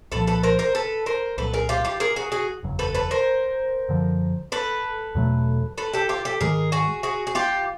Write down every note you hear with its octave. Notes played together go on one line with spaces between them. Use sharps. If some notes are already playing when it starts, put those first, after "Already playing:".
C2 A#2 F3 A4 B4
A4 B4
A#4 C5
A#4 C5
A4 B4
A#4 C5
C2 A#2 F#3 A4 B4
G#4 A#4
F4 G4
F4 G4
G#4 A#4
F#4 G#4
F#4 G#4
F#1 E2 C#3 F#3
A4 B4
A4 B4
A#4 C5
F#2 D3 F3
A4 B4
E2 B2 F#3 A3
A4 B4
G4 A4
F4 G4
G4 A4
G#2 D#3 G#3 G#4 A#4
F#4 G#4
F#4 G#4
G#4
F4 G4